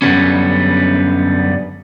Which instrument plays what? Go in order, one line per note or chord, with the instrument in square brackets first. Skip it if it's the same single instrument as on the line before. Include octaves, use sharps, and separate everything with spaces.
[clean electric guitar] F#2 D3 D#3 G3 B3 C#4